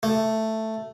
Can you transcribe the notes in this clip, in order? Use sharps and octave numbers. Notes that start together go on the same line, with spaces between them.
A3